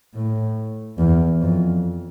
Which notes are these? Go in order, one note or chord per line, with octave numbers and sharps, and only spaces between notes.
A2
E2
F2